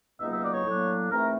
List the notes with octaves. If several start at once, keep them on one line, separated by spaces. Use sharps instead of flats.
C#2 B2 F#3 A#3 D#4 E5
E5
D5
C#5
A2 F#3 A#3 D4
G#2 E3 A3 C4 A#4